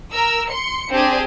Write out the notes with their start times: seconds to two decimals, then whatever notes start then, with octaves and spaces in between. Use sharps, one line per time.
0.13 A#4 E6
0.49 C6 C#7
0.91 C4 D4 G4 G#4